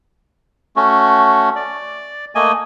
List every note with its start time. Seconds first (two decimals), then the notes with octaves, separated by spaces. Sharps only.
0.76 A3 C#4 F#4
1.56 D5
2.35 A3 A#3 D#5 G#5